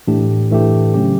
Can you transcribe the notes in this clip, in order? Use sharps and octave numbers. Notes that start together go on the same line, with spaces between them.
A2 E3 A3 D4 G4
A2 E3 A3 D4 G4
C#3 F#3 C#4 G4